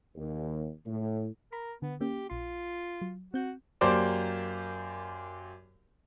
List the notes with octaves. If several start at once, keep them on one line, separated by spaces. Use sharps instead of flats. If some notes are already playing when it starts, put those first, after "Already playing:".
D#2
A2
A#4 B5
D3 B3
A#3 C#4 G4
A#1 F4 C6
F#3
C4 F#4 G6
F#2 A#3 G4 C5 D5 D6